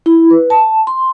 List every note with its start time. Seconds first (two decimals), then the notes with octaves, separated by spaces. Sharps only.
0.06 E4
0.30 B4
0.50 A5
0.87 C6